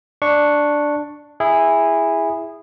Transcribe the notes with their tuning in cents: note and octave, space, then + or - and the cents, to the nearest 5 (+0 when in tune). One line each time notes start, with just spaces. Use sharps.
D4 +5 C#6 +0
E4 +0 G#4 -15